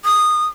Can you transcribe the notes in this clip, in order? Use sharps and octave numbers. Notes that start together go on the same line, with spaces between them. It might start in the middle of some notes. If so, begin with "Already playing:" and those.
D#6